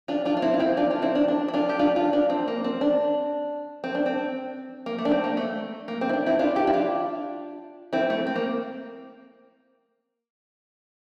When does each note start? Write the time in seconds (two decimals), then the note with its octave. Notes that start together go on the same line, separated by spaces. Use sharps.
0.08 D4 F4
0.25 D4 F4
0.37 F4
0.42 C4 E4
0.54 F4
0.60 C4 E4
0.77 D4 F4
0.91 F4
1.02 C4 E4
1.15 D4
1.28 D4
1.48 E4
1.54 D4 F4
1.69 G4
1.79 D4 F4
1.96 D4 F4
2.13 D4
2.30 C4
2.48 A#3
2.64 C4
2.81 D4
3.84 C4
3.95 D4
4.06 C4
4.86 A#3
4.99 A3
5.05 D4
5.11 C4
5.24 A#3
5.37 A3
5.88 A#3
6.01 C4
6.09 E4
6.13 D4
6.26 C4 E4
6.39 D4 F4
6.56 E4 G4
6.67 E4
6.73 D4 F4
7.93 C4 E4
8.10 A3
8.27 C4
8.36 A#3